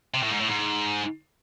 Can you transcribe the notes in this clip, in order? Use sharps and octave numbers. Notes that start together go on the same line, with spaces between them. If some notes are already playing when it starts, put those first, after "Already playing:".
C3
A2
G#2
A2
G#2